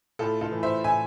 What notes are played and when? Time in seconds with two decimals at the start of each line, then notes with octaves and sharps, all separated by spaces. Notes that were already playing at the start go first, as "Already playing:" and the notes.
0.19 A2 F4 A4
0.41 F4 A4
0.52 E3 A3
0.63 C5 E5
0.84 A2 E5 G#5